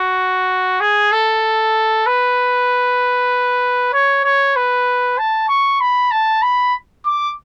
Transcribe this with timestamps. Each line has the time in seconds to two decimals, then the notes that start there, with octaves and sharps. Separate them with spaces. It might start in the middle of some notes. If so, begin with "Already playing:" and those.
Already playing: F#4
0.81 G#4
1.12 A4
2.06 B4
3.93 C#5
4.24 C#5
4.56 B4
5.18 A5
5.48 C#6
5.81 B5
6.11 A5
6.42 B5
7.06 D6